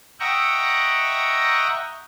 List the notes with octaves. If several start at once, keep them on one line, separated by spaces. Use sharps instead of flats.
D#5 E5 F#5 G5 A#5 C#6